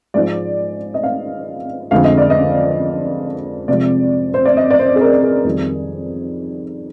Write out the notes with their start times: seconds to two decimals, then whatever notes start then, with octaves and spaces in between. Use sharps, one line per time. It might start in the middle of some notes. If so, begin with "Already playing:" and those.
0.14 G#2 F3 G#3 D5
0.94 D#5
1.03 F5
1.91 F2 D3 G#3 F5
2.04 D#5
2.18 D5
2.30 D#5
3.68 C3 F3 G#3 D5
4.34 C5
4.45 D5
4.57 D#5
4.70 D5
4.79 C5
4.96 G#4
5.01 A#4
5.23 G#4
5.44 F2 D#3 G3